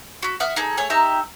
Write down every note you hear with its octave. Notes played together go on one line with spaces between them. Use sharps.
F#4 B5
E5 F#5 D#6 F6
D#4 G#4 A4
A3 G#4 C#5 G#5
D#4 G4 E5 A#5